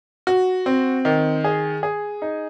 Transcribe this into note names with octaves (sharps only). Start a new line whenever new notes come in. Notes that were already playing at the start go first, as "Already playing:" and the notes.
F#4
C4
D#3
G#4
G#4
D#4